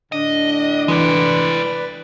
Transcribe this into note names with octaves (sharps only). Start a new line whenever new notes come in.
A2 D3 D4 D#5
E3 G#3 B4 D5